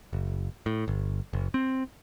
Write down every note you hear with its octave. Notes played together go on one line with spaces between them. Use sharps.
F#1
A2
G1
F#1
C4